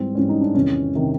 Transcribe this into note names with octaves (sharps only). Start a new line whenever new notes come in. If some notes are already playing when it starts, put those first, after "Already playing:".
Already playing: G#2 E3 G3 C4
G#2 E3 G3 C#4
D#4
D4
E2 C3 D#3 C#4
C3 D#3